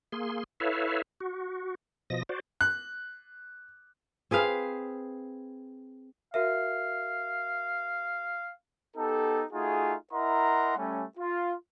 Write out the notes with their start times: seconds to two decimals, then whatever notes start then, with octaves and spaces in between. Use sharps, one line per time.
0.12 A#3 G#4 C6
0.60 E4 A4 B4 C#5 E5 F5
1.20 F#4
2.10 B2 F3 D#5 A#6
2.29 F#4 C5 D5
2.61 F#6
4.31 C4 G#4 B4 F5
6.34 F#4 A#4 E5 F5
8.96 B3 D#4 G4 A4
9.53 A3 D#4 F4 F#4 G#4
10.13 E4 A#4 D#5 F#5 A#5 C6
10.77 G3 A3 C#4
11.18 F4